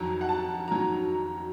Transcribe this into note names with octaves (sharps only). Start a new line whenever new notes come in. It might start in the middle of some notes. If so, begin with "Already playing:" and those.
Already playing: F2 D#3 F#3 A#5
F#5
A5
D#3 F#3 A#5